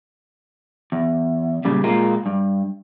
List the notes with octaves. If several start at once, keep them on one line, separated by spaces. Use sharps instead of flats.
E2
A#2 C#3 G3
A#2 G#3 A#3 F4
G2